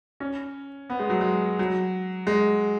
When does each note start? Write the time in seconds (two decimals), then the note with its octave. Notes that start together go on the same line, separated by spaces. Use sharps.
0.20 C#4
0.90 B3
0.99 G#3
1.10 F#3
1.21 G#3
1.59 F#3
2.27 G#3